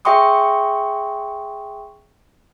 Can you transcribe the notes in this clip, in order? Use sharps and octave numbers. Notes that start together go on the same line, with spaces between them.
G#4 E5 G5 C6 C#6 D#6